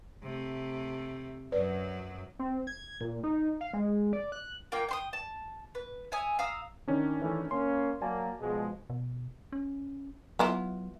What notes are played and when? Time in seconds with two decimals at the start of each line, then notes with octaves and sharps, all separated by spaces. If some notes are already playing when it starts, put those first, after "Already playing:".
0.23 C3 A3
1.52 F#2 F#3 B4 D5
2.39 C4
2.67 G#6
3.01 A#2
3.23 D#4
3.61 F5
3.74 G#3
4.13 D5
4.32 F#6
4.72 A#3 F4 G5
4.89 G5 C6 D#6
5.13 A5
5.75 B4
6.12 C#5 E5 G#5 D#6
6.39 F5 A#5 D#6 E6
6.88 D#3 C#4 D4
7.21 E3 A3
7.51 A#3 C#4 C6
8.01 F#3 A#3 D5 G#5 A5
8.41 B2 F3 G#3
8.90 B2
9.52 C#4
10.39 F#3 B3 E4 F4